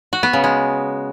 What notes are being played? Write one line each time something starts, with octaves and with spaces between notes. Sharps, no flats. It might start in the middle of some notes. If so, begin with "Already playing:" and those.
F#4
B3
C#3
G#3